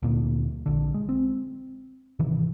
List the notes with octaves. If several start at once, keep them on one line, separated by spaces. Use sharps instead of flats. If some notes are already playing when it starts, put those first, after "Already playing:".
D2 A#2 A#3
A#1 D3
G#3
C4
G#1 C3 D#3 E3